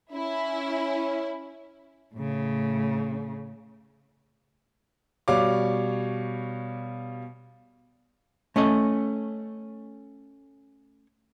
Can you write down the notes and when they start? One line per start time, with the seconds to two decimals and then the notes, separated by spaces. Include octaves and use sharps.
0.12 C#4 E4
2.15 A2 C#3
5.28 B2 G3 C#5 F5 D6
8.56 A3 C#4 D#5